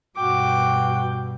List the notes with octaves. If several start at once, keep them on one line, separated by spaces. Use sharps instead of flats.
G2 B2 F#4 G5 D6